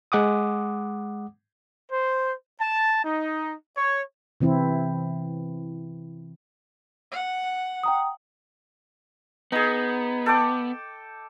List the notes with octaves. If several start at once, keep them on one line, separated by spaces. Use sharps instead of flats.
G#3 F#5 D6 D#6
C5
A5
D#4
C#5
C3 E3 C4 E4
F#5
G5 A#5 D#6
B3 D#4 G#4
A4 G5 D6